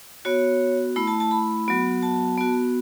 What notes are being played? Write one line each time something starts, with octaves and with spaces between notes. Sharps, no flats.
B3 F#4 C#5
A3 E4 B5
A5
A5
B5
F#3 B3 F#4
A5
B3 F#4